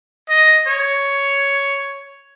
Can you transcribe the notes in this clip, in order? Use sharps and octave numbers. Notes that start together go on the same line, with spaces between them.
D#5
C#5